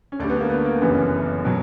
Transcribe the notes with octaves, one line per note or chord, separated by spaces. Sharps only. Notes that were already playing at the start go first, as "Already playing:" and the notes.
C#4
D2 D3 G3 D4
B3
A#3
B3
A#3
F#1 F#2 E3 G3 B3
B2 F#3